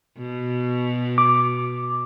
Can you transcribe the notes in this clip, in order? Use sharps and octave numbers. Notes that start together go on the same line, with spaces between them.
B2
D6